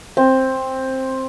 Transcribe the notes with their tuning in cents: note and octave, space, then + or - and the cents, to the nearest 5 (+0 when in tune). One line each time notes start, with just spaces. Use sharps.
C4 +10